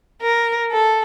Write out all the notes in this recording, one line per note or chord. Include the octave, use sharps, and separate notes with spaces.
A#4
A4